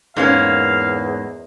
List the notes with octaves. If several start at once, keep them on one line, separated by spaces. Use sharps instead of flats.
E2 G#2 A#3 C#4 F5